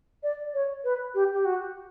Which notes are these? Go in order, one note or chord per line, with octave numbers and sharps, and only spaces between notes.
D5
C#5
B4
G4
G4
F#4